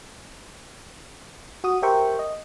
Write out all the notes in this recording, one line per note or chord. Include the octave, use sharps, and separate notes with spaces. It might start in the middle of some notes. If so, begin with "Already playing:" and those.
F#4 D#6
G4 A#4 C5 E5 G5 C#6
D#5